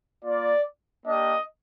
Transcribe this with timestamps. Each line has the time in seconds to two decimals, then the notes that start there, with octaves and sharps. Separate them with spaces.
0.24 A#3 F4 D5
1.05 A#3 D4 G4 D#5